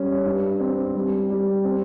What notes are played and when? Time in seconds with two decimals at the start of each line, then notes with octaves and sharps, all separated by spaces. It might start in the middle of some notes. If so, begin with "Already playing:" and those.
Already playing: G3 C#4
0.25 G2
0.60 C4
0.95 G3
1.30 G3
1.64 C4